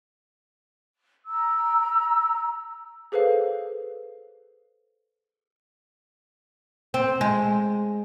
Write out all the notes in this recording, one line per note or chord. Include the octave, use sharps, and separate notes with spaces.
A#5 E6
G#4 A4 B4 C5 F5
C4
G#3